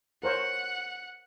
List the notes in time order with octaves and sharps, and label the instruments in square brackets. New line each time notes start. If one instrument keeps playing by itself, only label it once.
[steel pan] A#4 C5 C#5 [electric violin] F#5